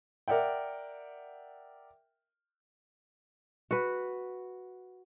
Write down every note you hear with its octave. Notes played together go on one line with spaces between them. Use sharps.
A#4 D5 E5 F#5 G5
F#4 B4